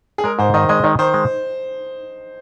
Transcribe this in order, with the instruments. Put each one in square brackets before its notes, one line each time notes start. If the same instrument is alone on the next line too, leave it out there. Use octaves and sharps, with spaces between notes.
[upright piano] G#4
[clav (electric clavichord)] G#3 [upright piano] A#4
[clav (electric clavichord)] G#2 [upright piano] C5
[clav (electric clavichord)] D#3 [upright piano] D#5
[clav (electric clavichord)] G#3 [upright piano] D#5
[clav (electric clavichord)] D#3 [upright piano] D#5
[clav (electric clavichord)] D#3 [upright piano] C5
[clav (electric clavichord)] G#3